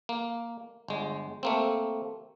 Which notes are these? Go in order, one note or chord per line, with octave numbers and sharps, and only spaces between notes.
A#3
G1 G#3
A3 A#3 C4